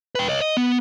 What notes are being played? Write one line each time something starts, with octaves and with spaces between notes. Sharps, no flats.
B4 G5
C#5 D#5
D#5
B3